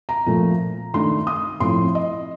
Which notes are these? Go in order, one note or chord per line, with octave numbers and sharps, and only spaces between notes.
A#5
A#2 F3 A3
D#3 A3 D4 C6
D#6
A2 F3 A3 C4 C6
D#5